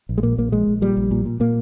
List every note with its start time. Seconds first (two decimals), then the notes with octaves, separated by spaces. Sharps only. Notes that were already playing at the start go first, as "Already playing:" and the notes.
0.09 A#1
0.18 G#3
0.23 A#2 A#3
0.38 A#1 A#3
0.52 A#1 G#3
0.67 A#1
0.82 A#2 G3
0.97 A#1
1.11 A#2
1.25 A#2
1.40 A#2 A#3